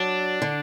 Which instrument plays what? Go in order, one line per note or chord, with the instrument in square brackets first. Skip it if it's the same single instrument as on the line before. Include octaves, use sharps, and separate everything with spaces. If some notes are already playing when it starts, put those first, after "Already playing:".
Already playing: [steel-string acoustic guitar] F#3 [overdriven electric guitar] D4
[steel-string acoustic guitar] D3